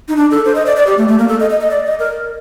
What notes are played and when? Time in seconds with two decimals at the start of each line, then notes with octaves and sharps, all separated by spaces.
0.08 D#4
0.17 D4
0.31 A4
0.45 C5
0.55 D#5
0.66 D5
0.76 D5
0.87 G4
0.97 A3
1.08 A3
1.18 A#3
1.28 A4
1.40 D#5
1.50 D#5
1.61 D#5
1.71 D5
1.85 D#5
1.99 A#4